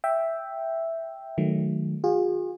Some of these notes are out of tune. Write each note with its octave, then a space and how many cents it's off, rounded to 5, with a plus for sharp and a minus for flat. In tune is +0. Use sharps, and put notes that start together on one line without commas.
E5 +0 G5 +0
D#3 +0 F#3 -5 A3 -20
F4 +40 G#4 -35